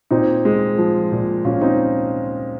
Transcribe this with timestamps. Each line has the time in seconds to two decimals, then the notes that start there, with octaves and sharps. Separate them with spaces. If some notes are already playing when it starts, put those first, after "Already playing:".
0.10 A#2 C4 D#4
0.45 G#3
0.78 F3
1.12 A#2
1.45 A#2 C#4 F4
1.61 C4 D#4